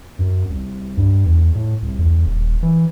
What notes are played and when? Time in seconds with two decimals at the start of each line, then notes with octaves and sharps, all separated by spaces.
0.19 F#2
0.50 C2
0.97 G2
1.26 E2
1.55 A2
1.83 C2
1.99 E2
2.26 D#1
2.63 E3